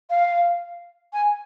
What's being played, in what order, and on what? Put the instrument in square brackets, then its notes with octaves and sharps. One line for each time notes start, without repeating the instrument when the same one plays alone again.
[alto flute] F5
G#5